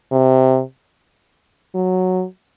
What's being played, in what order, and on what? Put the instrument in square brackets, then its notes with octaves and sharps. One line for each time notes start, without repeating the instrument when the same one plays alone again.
[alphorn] C3
F#3